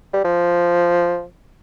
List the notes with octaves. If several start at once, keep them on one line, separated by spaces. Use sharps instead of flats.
G3
F3